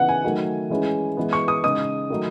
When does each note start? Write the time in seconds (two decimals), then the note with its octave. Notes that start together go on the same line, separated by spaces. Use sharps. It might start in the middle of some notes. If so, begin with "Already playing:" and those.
Already playing: C#3 E3 B3 D#4 F#5
0.09 G#5
0.24 D#3 F#3 A3
0.70 E3 G#3 C#4 E4
1.17 E3 G#3 B3
1.33 C#6
1.48 D#6
1.64 C#3 G#3 D#4 D#6
2.10 D#3 F#3 A3 D#4